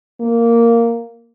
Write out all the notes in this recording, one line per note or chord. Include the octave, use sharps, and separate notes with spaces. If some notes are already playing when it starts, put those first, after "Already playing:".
A#3